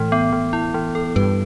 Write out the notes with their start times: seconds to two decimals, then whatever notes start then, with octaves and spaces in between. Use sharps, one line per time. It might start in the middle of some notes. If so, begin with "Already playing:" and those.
Already playing: A2 E3
0.12 B3
0.33 E3
0.53 E4
0.74 E3
0.95 A4
1.16 G2 B4